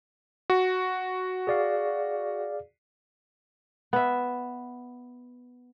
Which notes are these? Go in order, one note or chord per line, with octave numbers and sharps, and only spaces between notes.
F#4
G#4 D5 F5
B3 E5